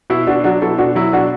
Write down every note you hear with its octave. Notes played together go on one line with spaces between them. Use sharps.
B2 E4
B2 D4 F#4
F#3 D4 F#4
B2 E4 A4
B2 D4 F#4
F#3 E4
B2 D4 F#4